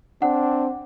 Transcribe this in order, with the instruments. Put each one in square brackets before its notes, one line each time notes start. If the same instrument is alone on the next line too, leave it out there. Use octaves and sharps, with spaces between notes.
[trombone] C4 [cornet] D4 [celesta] F#5